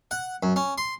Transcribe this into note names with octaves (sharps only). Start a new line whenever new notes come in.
F#5
F#2
C#4
C6